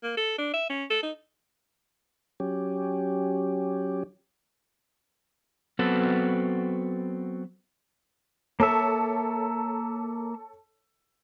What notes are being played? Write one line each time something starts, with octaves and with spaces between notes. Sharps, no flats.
A#3
A4
D4
E5
C#4
A4
D#4
F#3 C#4 G4
F#3 B3 C4 F#4 A4 B4
A#3 A4 C#5 E5